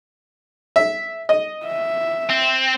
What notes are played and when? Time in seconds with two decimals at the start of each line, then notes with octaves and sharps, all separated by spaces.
0.76 E5
1.29 D#5
1.66 E5
2.29 C4